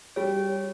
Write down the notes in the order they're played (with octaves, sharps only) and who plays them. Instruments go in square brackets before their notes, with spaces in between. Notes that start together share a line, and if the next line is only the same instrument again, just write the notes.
[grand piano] G3 [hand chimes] C#5